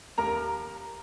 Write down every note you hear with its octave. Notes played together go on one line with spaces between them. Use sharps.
D#2 A#4 A#5